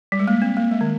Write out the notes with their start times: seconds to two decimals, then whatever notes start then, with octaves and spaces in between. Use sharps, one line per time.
0.12 G3
0.19 G#3
0.28 A#3
0.42 C4
0.57 A#3
0.71 G#3
0.81 D#3